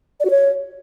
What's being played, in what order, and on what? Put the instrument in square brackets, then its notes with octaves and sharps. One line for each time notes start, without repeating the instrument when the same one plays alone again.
[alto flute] D5
F#4
C#5